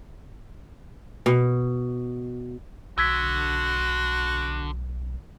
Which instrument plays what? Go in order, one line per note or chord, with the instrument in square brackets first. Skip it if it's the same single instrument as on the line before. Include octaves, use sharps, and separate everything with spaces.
[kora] B2
[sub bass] B1 [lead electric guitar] D3 [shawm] F#4 [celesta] E6 G#6 B6